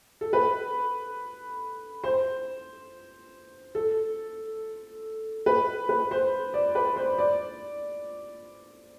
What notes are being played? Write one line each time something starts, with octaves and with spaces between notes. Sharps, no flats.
A4
B4
C5
A4
B4
B4
C5
D5
B4
C5
D5